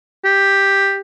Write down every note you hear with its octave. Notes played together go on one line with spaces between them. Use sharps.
G4